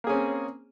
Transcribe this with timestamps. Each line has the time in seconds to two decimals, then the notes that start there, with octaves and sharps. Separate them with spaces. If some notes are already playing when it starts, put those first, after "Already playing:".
0.04 A#3
0.07 G#4
0.09 C#4
0.12 C4